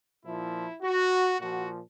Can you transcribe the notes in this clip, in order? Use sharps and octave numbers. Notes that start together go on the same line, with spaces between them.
A#2 F3 E4
F#4
A#2 F3 F#4